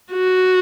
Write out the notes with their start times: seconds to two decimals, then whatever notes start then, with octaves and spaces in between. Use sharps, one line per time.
0.12 F#4